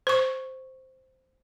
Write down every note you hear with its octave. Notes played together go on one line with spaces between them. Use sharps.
C5 C#6